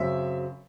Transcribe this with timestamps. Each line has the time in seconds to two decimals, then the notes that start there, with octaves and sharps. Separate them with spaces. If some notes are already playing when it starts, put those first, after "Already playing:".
Already playing: F#2 C#3 F#3 C4 E5